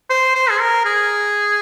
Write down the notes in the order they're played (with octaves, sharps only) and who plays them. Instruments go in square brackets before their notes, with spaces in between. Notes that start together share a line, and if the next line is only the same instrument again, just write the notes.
[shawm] C5
C5
G#4
A#4
G#4